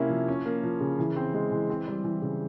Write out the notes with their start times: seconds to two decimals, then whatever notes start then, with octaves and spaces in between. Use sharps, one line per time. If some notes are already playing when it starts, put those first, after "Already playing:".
Already playing: C3 A#3 C#4 E4
0.10 F3
0.28 C#4
0.45 A#3
0.63 F3
0.80 C#3
0.99 E3
1.16 C4
1.34 G#3
1.51 E3
1.70 C4
1.88 G3
2.04 E3
2.22 C#3